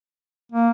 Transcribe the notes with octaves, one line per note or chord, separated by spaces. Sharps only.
A#3